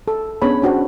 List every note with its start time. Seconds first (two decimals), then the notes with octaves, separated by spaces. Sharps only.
0.08 A4
0.42 B3 C#4 D4 G#4 C#5 B5
0.62 C#4 D4 F#4 C5